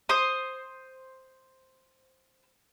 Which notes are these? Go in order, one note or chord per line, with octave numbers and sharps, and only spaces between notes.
C5 D#6